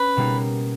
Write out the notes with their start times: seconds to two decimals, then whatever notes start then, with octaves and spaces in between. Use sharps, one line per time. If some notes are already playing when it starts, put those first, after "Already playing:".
Already playing: C#4 B4
0.17 B2 G3 A#3 D#4